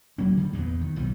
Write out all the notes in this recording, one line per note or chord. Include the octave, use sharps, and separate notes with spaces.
E1 F#3 A#3 C#4
D3 G3
E2 G2 A#2 B3
D#3
B1 D#3 E3 G3